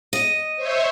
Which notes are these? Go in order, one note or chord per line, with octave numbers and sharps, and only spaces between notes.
D#5
C5 C#5 E5